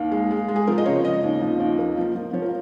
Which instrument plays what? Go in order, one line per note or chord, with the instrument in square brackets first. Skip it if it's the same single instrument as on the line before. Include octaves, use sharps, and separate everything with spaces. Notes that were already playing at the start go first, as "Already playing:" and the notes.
Already playing: [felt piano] D#2 F5
G#3
G#3
G#3
G#4
F3 A#4
D#5
C#3 C#5
C#3 D#5
D#2
F3
D#2
A#3
F3
F3
F3 C#5
A#4